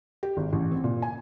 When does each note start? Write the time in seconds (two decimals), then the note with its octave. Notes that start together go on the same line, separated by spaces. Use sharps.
0.23 G4
0.37 G#1
0.53 A1
0.72 C4
0.84 A#2
1.02 G#5